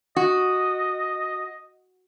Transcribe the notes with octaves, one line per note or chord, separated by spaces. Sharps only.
F#4 D#5